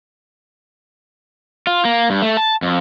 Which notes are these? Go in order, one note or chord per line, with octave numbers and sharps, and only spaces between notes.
F4
A#3
G2
A3
A5
F2